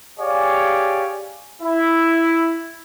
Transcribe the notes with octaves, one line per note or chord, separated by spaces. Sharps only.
G4 G#4 C#5 D5 F5 G#5
E4